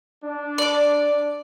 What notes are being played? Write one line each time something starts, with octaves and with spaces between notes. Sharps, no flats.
D4
D5 D6